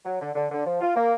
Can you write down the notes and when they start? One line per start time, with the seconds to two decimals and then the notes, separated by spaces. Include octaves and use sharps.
0.05 F#3
0.20 D3
0.35 D3
0.51 D3
0.66 F3
0.80 F4
0.96 A#3